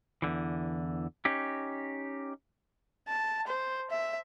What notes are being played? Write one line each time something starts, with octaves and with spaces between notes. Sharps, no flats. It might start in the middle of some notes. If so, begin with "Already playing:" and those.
E2 G#2 D3 E3
C#4 D#4 G4
A5
C5
E5